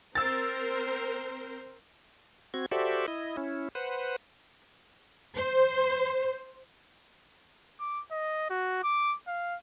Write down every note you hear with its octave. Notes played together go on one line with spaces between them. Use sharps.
C4 A#4 C5 E6 A6
C4 F#4 G#6
F#4 G4 A4 C5 D5 E5
E4 D#5
C#4 E4
B4 C5 F#5
C5
D6
D#5
F#4
D6
F5